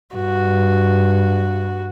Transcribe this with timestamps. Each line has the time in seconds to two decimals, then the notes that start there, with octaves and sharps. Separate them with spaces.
0.15 G2 F#4